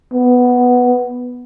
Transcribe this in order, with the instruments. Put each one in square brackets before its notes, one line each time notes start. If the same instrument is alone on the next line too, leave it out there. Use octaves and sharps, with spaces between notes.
[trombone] B3